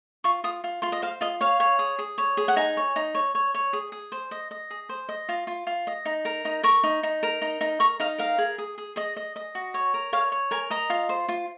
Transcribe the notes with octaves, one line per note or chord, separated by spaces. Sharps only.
F4 C#6
F4 D#6
F4
F4 C6
D#5
C5 F5
F4 D#5
C#5 F5
C#5
G#4
G#4
C#5
G#4
F#5
D#4 G#5
C#5
D#4
C#5
C#5
C#5
G#4
G#4
C5
D#5
D#5
G#4
C5
D#5
F4
F4
F4
D#5
D#4
A#4
D#4
A#4 C#6
D#4
D#4
A#4
D#4
D#4
A#4 C#6
D#4 F5
A#4 F5
G#4
G#4
G#4
G#4 D#5
D#5
D#5
F#4
C#5
A#4
C#5 F5
C#5
A#4 G#5
D#5 A#5
F4
C5
F4